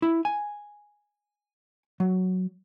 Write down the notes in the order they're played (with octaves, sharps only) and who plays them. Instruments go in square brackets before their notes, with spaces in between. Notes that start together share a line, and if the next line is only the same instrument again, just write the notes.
[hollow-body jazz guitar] E4
G#5
F#3